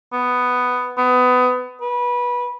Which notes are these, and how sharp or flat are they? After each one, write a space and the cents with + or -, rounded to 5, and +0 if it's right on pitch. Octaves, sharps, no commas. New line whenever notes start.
B3 +5
B3 +25
B4 -20